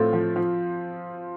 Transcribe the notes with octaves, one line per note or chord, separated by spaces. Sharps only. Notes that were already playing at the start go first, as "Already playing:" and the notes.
Already playing: A2 F3 A3 C4 F4
F3
F3